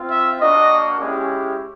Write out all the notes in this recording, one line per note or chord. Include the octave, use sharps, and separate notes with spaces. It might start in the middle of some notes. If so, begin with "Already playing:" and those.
Already playing: C4 F4
E5
A#3 D4 F#4 D#5
G#3 C#4 E4 G4